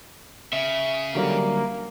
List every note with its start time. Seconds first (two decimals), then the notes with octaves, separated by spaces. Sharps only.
0.53 C#3 E5
1.15 D3 F#3 G3 A#3